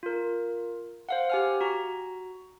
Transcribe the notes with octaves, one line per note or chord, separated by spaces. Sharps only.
F4 A#4
C5 F5 F#5
G4 G#5 F6
F#4 A#5